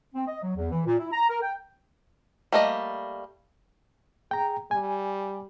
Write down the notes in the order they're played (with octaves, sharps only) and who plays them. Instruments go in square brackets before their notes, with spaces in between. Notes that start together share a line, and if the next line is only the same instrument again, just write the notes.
[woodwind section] C4
D#5
F#3
E2
E3
A#2
E4
A#5
A#4
G5
[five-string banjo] G3 A3 A#3 D#5
[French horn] G#4 [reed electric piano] G5 A#5
[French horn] G3 [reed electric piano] G#5